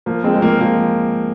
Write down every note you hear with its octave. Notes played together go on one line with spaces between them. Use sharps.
F3 A#3
G#3 C4
G#3
F3 A#3
F3 A#3